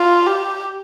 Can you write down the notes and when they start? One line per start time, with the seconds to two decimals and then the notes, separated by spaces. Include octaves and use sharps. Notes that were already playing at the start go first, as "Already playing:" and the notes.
Already playing: F4
0.26 G4